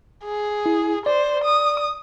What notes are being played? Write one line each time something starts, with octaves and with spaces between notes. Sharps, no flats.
G#4
E4
C5 D5
D#6